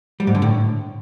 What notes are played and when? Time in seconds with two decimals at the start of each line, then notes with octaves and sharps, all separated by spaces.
0.20 G3
0.27 G#2
0.35 D3
0.42 A2